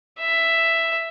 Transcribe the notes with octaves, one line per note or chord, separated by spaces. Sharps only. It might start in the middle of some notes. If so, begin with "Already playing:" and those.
E5